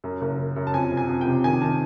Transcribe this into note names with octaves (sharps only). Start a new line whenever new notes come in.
F#2
F#1
F#1
F#2
A5
F2 G#5
C3
G#5
F2
C3 G5
D#3 G#5
D#3 A5